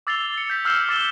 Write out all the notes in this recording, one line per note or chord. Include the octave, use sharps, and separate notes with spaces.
D6 E6 A6 C7 F7 G7
G7
C#7
G6 B6
E6 F6 G6 C7 E7 F#7
D6 A6 E7 G7